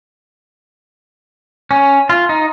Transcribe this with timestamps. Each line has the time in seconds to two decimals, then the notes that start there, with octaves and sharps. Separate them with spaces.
1.71 C#4
2.09 F4
2.29 D#4